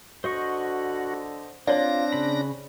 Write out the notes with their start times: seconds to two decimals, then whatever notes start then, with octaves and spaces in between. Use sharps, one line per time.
0.24 D3 F#4 C5 D#5 C#6
1.67 C4 D4 F4 C#5 D5 A#6
2.13 C#3 B5